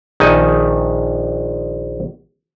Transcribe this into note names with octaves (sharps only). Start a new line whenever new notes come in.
A#1 D#3 D#4 G#5